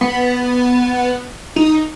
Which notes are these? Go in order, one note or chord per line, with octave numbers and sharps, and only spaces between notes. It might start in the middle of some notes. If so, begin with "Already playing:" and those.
B3
D#4